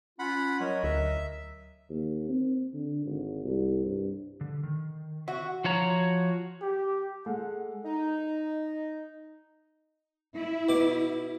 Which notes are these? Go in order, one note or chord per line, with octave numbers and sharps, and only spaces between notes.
C#4 F4 F#5 B5
F#3 A#4 C#5 D#5
D2 E5
D#2
C4
D3
G#1
C2
G2
D3
D#3
F#4 E5
F3 F#4 C#5 A#5
G4
G#3 A4 F#5
D#4
E4
B2 D6